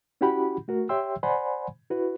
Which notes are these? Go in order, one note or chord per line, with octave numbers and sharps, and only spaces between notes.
C#4 E4 F#4 G4 F#5 B5
A3 F#4 A#4
G4 C#5 E5 G5 C6 E6
C5 D5 F#5 G#5 B5 C6
E4 F#4 B4